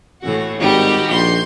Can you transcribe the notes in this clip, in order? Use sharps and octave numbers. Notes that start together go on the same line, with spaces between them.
A2 E3 F#4
G#1 G3 D#4 F#4 G4
A#1 C6 G6